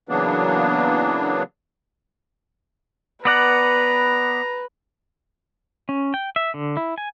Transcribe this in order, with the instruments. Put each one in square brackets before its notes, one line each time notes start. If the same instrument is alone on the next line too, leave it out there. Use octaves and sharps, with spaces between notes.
[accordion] C#3 E3 F#3 A#3 B3 D4
[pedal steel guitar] B3 D5 F#5 [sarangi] B4 [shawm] A#5
[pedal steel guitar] C#4
G5
E5
D3
E4
G#5